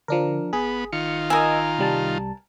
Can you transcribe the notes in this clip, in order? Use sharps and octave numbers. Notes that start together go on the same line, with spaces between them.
D3 F3 D4 A#4
F#1 B3 G#4
D#3 F4 C#7
A#4 D#5 G#5 E6
C2 G3 A5